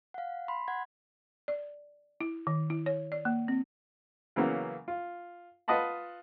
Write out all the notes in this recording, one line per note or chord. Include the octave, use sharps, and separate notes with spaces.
F5 F#5
B5 C6
F#5 G#6
D5
E4
D#3
E4
C#5
D5
A#3
C4
C#3 E3 F#3 A#3 B3
F4
F4 B4 D#5 F#5 A5 B5